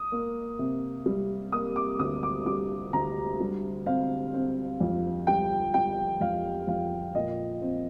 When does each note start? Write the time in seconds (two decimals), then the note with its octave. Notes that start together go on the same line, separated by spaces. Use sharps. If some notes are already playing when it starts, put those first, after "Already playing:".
Already playing: D#6
0.12 A#3
0.59 C3
1.06 G3
1.52 A#3 D#6
1.76 D6
1.99 D2 D#6
2.23 D6
2.46 G3 D6
2.93 D2 A#5
3.40 G3
3.86 C4 F5
4.34 C4
4.80 F2
5.27 G3 G5
5.74 G3 G5
6.21 F2 F5
6.67 F2 F5
7.15 A#2 D#5
7.61 C4